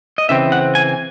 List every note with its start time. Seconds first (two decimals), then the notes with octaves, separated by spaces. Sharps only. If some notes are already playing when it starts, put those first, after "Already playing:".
0.18 D#5
0.29 C#3 E3 C4 E5
0.52 F#5
0.75 G#5